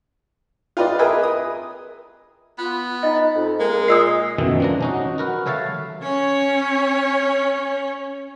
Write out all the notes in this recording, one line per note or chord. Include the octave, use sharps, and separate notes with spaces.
F4 G4 B4 D5 D#5
G#4 A#4 B4 D#5 E5
D#6
B3 F4
D#4 D#5
F2
G#3 A#3 A#4
A#2 D#5 D#6 E6 C7
F#2 B2 D#3 E3 A3
F3 D4 A#5
C#4 D#4 F#4
F#4 A#4 B4
A4 C#5 E5 F5 A5
C#4 C#5